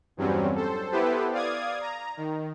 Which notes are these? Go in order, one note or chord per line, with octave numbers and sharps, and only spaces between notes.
E2 G2 F#3 G3 C4 C#4
A4 C5
B3 E4 G4 A4 B4 C5
D5 F5 D#6 G#6
A#5
D#3